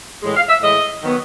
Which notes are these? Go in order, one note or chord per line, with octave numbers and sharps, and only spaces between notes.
A2 E3 G#3
F5
E5
A2 E3 G#3 D#5
D#3 F#3 B3